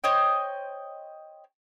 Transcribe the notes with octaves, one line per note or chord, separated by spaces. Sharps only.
C5 C#5 D#5 G5